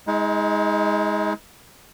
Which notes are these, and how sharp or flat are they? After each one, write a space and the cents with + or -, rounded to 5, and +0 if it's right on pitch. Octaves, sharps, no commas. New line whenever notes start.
G#3 +0 D#4 +40